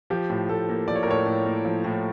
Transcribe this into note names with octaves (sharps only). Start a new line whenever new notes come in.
F3 G4
A2
A2 A4
A#3
F3 D5
C#5
A#4
A2 A4 C#5
A2
A#3
F3
A2